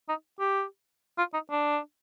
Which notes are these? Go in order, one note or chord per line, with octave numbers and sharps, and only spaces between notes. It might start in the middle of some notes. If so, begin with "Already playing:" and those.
D#4
G4
F4
D#4
D4